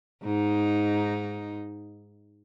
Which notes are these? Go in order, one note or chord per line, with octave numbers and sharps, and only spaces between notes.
G#2 D#4